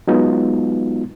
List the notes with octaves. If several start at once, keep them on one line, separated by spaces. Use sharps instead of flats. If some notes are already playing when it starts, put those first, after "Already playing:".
F#3 G#3 B3 D#4 F4 F#4